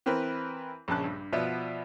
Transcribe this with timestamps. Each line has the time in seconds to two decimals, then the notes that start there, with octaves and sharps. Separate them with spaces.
0.06 E3 C4 A#4 B4
0.88 A#1 C#3 A5 F#6
1.04 G2
1.33 B2 F3 B3 D5 E5